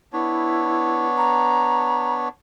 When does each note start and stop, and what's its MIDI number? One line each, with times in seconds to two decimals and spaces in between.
0.13 2.29 59
0.13 2.29 62
0.13 1.06 64
0.13 2.29 73
1.17 2.14 82